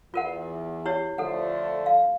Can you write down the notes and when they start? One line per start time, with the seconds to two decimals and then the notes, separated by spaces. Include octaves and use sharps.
0.14 E2 F4 A#4 F#5
0.85 E4 G4 C#5
1.18 D3 F3 A3 A4 F#5
1.86 F5